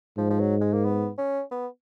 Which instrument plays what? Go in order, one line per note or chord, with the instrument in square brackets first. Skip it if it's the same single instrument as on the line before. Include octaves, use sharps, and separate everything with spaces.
[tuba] G#2 [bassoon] F3
[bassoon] F3
F#3
G#3
A#3
B3
C#4
B3